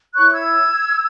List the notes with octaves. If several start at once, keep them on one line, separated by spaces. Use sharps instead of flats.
E4 C#5 C#6 F#6
E6 G#6